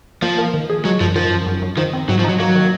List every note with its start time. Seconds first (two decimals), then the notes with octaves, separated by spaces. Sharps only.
0.22 F3 A#3
0.38 A#3
0.54 D#3
0.70 G#4
0.84 F#3 G#3
1.00 F#2 F3
1.16 D#3 F3
1.31 F#2
1.46 F#2
1.62 F#2
1.77 D#3 F3
1.93 C4
2.09 G#2 F#3
2.19 F3
2.24 F#3 D#4
2.39 F#3 A#3
2.55 D#3